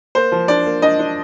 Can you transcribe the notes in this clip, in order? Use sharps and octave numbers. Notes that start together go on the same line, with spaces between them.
A#3 C5
F3
D4 D5
A#3
D4 D#5
D4